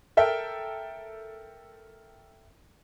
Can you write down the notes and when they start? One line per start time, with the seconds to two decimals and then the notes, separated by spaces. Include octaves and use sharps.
0.17 A4 A#4 E5 G5